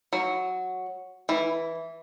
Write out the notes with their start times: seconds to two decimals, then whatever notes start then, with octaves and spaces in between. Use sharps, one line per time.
0.13 F#3
1.29 E3